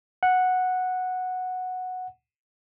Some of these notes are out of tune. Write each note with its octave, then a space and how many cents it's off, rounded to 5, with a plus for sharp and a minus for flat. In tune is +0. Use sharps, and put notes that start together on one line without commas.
F#5 -5